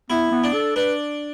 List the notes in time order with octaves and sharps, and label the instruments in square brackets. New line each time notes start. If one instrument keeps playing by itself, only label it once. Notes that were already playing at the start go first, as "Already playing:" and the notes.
[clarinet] B3 [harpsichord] E4
[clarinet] B3
[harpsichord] D4
[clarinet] A4
[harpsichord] D4 [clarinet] B4